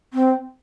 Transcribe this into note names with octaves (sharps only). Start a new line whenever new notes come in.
C4